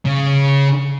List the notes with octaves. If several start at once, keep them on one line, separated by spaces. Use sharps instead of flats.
C#3